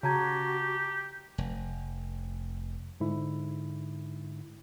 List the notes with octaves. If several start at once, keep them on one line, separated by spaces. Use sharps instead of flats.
C#3 F#4 G4 A5 A#5 G#6
F1
G#2 D3 E4